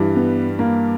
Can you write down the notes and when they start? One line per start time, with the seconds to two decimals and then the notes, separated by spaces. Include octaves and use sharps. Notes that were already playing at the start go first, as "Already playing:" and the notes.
Already playing: G2 E3 G3
0.16 B3
0.59 A#3